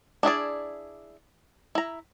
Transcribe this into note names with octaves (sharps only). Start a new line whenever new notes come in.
D4 E4 G#4 D5
E4 A#5